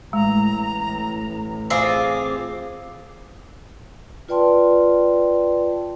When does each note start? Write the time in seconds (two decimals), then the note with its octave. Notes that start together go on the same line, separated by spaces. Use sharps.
0.13 A1 A2 G#3 A#5
1.70 C4 F4 G#4 D6
4.29 F4 B4 D5 G5 A5 C6